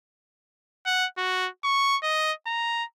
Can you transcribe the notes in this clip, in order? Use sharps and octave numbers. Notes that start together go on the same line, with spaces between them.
F#5
F#4
C#6
D#5
A#5